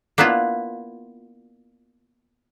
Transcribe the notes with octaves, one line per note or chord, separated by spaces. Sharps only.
A#3 B3 D4 E4 F4